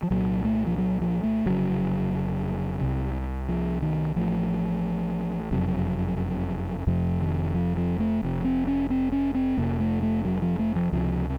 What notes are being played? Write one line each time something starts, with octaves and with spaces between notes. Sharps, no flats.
F3
C2 A#2 F#3
A3
F3
F#3
F3
A3
F1 F2 C#3 F#3
C2 C3
F3
D#3
A1 A2 F3
F#1 F2 C3 F#3
F1 F2 C3 F3
D#3
F3
F3
A3
F1 F2 C3
C4
C#4
C4
C#4
C4
F1 F2 C3 A#3
A3
A3
F#3
F3
A3
F3
C#2 C3 F3